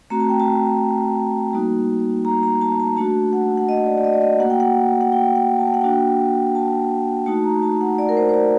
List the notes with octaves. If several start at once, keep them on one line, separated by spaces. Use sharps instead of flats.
A3 C4 F#4 A#5
A5
G5
A5
G3 A#3 D#4 F#4
A#5
A#5
A5
A5
A3 D4 F#4 A5
F#5
F#5
D#5
D5
D5
D#5
D5
D#5
A#3 F#4 F#5
G5
F#5
F#5
G5
F#5
A5
G5
F#5
A#3 D4 F#4 G5
A5
A3 D#4 F#4 A5
A#5
A5
F#5
D5
A#4
C5
C5
D5